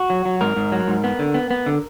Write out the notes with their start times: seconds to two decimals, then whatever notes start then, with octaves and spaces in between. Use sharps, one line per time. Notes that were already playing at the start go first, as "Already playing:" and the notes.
Already playing: F#4
0.10 F#3
0.25 F#3
0.41 G#2 A#4
0.56 G#2
0.72 F#3
0.88 G#2
1.04 B3
1.19 D3
1.34 B3
1.51 B3
1.66 D3